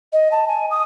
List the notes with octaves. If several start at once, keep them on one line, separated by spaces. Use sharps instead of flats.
D#5
A5
G#5
D#6